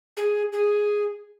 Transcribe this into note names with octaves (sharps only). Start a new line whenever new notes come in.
G#4
G#4